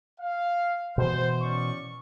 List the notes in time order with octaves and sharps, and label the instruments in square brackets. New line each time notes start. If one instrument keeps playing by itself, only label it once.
[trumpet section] F5
[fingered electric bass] B2 E3 [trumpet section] C5
[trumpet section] C#4 D5 C#6